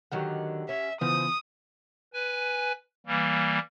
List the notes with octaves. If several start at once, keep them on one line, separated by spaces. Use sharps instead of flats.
D3 D#3 F#3 G4 F#5
C#4 E5
C#3 E3 F3 B3 D#6
B4 G#5
E3 G3 A#3